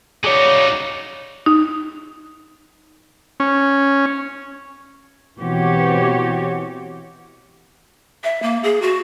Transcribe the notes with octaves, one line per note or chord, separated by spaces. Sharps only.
F#3 D#4 G#4 C#5 D5
D#4
C#4
B2 E3 C4 F#4 G4 C#5
E5
A#3
G#4
F#4